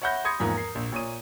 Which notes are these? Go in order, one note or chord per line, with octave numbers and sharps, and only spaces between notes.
C#5 E5 F#5 B5 G6 A#6
B5 C6 D#6 G#6 A#6 C#7
E2 G#2 F3 A#3
A#4 C7
A#1
A#2 C#5 D#6 D#7